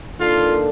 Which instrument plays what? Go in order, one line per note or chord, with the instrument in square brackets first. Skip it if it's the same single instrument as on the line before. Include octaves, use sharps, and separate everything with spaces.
[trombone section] D#3 A#3 D4 A4 [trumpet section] F4